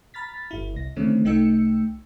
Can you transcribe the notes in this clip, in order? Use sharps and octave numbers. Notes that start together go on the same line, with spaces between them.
A#5 B5 F6 A6 B6
G1 E4
C2 A#6
D3 D#3 A3 C4 C#4
C2 A3 D#4 G5 E6 C#7